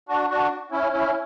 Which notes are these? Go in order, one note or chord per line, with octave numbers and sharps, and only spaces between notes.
D4 F#4
D4 F#4
C#4 E4
C#4 E4